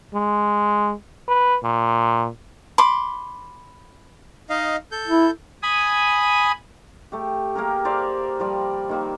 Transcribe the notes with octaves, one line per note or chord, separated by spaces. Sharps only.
G#3
B4
A#2
B5 C6 D6
D#4 D#5 F5
A4 G6
E4
G#5 B5 D#6
A3 G4
A#3 G4 G#4 A#4
C5 D5 E5 F5
F3 G3 D5
D#3 A#3 E5